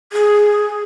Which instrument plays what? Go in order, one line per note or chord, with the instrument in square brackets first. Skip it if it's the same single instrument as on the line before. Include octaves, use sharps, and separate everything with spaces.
[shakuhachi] G#4